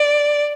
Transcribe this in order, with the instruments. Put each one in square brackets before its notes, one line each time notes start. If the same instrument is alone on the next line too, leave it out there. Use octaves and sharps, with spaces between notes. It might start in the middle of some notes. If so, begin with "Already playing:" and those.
Already playing: [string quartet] D5